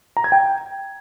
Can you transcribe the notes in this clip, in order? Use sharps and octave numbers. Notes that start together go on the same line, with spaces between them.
A#5
G#6
G5